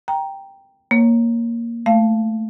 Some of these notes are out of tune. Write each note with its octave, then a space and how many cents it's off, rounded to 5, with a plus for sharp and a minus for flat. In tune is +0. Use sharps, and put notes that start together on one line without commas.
G5 +0 A#5 +5
A#3 +0 C#5 +0
A3 +0 F5 -20